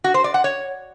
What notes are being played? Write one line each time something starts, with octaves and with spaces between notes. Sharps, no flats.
F#4
C5
D5
F#5
C#5